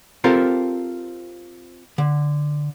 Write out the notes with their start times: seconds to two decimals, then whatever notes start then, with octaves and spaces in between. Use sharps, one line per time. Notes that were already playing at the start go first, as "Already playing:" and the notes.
0.24 C4 F4 G4 A4 A#4 C5
1.98 D3